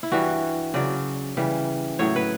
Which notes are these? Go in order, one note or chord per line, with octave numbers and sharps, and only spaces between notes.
E4
G2 E3 G3 F#4
C#3 F#3 D5
C#3 E3 G3
A2 F#3 C#5
B4